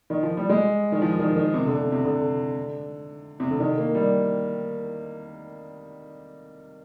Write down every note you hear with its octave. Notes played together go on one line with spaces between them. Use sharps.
D#3
F3
G3
G#3
D#3
F3
D#3
D#3
C3
D3
C3
C3
D3
C3
D3
D#3
A#3
G3